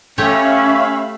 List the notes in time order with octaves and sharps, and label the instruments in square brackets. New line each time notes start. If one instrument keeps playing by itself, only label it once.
[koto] A3 G4 C#5 [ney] C#4 [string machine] E5 F5 B5